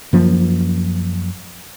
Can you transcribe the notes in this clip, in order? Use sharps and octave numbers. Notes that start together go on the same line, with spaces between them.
F#2 F3 A#3